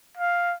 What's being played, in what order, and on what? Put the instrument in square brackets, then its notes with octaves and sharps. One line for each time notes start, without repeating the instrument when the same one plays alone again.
[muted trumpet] F5